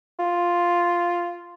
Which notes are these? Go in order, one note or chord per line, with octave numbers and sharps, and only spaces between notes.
F4